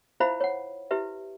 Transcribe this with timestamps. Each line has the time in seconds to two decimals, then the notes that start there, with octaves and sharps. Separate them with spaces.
0.20 E4 F4 C5 E5 F5 B5
0.40 C#5 F#5
0.91 E4 G4 B4 E5